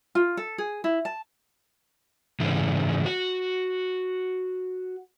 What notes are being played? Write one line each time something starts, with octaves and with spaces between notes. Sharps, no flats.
F4
A4
G#4
E4
A5
G#2 C#3 E3
F#4